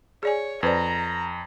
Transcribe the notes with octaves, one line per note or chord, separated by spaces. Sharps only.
G#4 C#5 D5 G#5
F2 B4 C5 D5 A#5